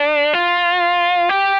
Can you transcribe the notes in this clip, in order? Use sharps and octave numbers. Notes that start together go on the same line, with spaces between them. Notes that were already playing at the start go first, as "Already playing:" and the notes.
Already playing: D4
F4
G4